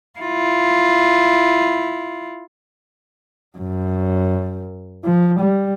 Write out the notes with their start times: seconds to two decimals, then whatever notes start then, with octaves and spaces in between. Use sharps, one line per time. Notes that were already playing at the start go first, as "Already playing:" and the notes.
0.19 E4 F4
3.58 F#2
5.04 F3
5.40 G3